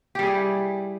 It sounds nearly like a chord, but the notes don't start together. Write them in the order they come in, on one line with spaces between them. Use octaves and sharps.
G4 G3 G#4 E4